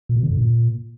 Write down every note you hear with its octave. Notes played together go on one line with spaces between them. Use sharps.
A#2
B2
D3
F#2
A#2